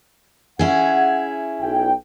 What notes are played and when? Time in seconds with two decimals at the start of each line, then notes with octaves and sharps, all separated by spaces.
0.59 C#4 E4 G#4 F#5
1.61 B1 G5